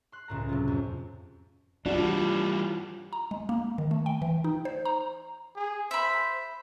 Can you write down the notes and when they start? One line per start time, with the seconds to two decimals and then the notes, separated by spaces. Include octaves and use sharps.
0.12 C6 F#6
0.28 C#2 A2 A#5
0.49 C3 F#3 F4
0.68 F2
1.86 E3 F3 G3 D4 F#4
3.13 A#5
3.31 G#3
3.49 A#3
3.78 D#3
3.91 A3
4.06 G5
4.22 E3
4.44 D#4
4.65 C5
4.85 A#5
5.56 G#4
5.91 C5 E5 B5